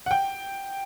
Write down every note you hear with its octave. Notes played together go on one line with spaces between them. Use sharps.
F#5
G5